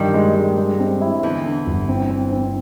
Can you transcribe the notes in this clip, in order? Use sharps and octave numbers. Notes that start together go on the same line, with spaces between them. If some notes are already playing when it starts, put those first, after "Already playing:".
Already playing: G2 D#3 G3
G#3
G#3
G#3
C4
E4
E2 D3 E3
D3
G1
C4
C4
C4